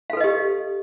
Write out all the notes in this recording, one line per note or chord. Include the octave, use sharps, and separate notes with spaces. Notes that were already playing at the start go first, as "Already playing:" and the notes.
G4 A4 B4 D#5 F5